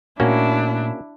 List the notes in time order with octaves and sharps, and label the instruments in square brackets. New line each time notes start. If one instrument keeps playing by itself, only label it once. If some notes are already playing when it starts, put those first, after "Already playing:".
[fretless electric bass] A#2 A3 [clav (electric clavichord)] A#3 C#4 F#4 [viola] D4 E4